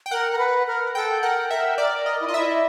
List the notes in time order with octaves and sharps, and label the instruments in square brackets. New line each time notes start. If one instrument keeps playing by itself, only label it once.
[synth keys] G5
[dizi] A#4 [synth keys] F#5
[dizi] A#4
B4
A#4
[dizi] A4 [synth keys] G5
[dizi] A#4 [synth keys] F#5
[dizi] A#4 [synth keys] E5
[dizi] A#4 [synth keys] D5
[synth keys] D#5
[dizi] E4
[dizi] F4 [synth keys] D#5
[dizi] E4 [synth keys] E5